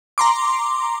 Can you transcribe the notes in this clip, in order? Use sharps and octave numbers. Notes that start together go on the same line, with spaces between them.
A#5 C6 D6